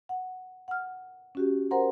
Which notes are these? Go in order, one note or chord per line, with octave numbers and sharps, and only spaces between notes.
F#5
F#5 F6
C#4 F#4 G4
A#4 C5 F#5 A#5 C6